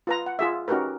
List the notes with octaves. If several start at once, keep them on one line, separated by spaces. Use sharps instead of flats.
F4 B4 A#5
F#5
F4 G#4 E5
C#4 D#4 F#4 G4 A#4 B4